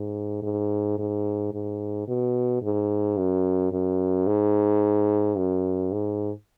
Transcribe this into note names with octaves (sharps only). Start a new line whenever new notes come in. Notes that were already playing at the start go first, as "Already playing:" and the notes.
Already playing: G#2
G#2
G#2
G#2
B2
G#2
F#2
F#2
G#2
F#2
G#2